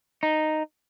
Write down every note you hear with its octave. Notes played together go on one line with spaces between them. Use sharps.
D#4